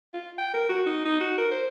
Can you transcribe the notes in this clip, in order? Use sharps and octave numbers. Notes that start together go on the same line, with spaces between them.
F4
G5
A#4
F#4
D#4
D#4
F#4
A#4
C5